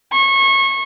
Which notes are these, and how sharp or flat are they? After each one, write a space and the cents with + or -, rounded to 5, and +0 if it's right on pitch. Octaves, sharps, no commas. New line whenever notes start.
C#6 -25